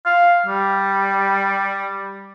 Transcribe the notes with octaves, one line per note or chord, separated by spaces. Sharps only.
F5
G3